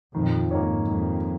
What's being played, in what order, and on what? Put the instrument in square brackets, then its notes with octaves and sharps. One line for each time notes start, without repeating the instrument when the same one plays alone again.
[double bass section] F2 A#2 [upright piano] D#3
[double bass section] G#2 [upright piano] A#3 D#4 C#5
[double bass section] F2 [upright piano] D#3